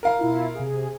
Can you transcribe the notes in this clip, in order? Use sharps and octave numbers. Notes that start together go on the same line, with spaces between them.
A#4 F5 A#5
B2 E4 F4
C3 G#4